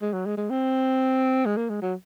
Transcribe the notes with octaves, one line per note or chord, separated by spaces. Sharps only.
G#3
F#3
G#3
G#3
C4
G#3
A#3
G#3
F#3